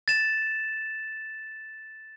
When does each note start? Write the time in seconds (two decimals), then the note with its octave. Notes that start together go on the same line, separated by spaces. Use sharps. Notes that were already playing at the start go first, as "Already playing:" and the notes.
0.08 A6 E7